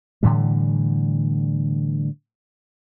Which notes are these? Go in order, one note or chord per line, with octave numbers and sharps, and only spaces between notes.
A2 D3 E3 G3